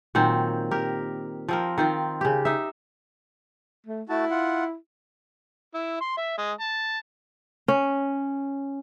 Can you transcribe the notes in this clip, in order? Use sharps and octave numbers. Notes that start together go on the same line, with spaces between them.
A#2 D#3 F#3 C4
G4 A#4
F3 C4 A#4
D#3 C4 F4
C#3 G4
D#4 E5
A3
A3 E4 F#4 A5
F4 F#5
E4
C6
E5
G#3
A5
C#4